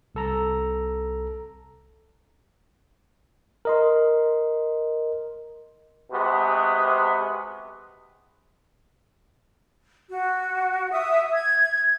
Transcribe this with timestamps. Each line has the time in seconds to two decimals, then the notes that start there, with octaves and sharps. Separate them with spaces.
0.15 C2 A4 A#5
3.65 A#4 D#5 C6
6.11 C3 G#3 B3 F#4
10.09 F#4
10.92 E5 D#6
11.34 G#6